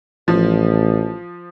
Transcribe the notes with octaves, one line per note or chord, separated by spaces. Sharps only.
A1 F3